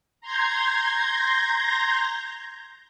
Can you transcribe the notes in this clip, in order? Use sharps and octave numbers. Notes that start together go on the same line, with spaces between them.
A#5 C6 G6 G#6 A#6